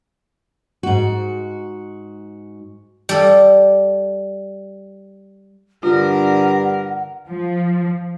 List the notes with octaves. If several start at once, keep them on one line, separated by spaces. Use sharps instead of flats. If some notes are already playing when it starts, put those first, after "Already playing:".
G#2 F#4
G3 A4
G2 D3 F4 A#4 F#5
F3